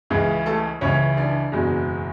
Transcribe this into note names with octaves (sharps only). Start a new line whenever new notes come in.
C#2 C#3 E3 G#3 G#4
A3 A4
C#2 C#3 E3 C#4 C#5
D4 D5
F#1 E2 B2 G#3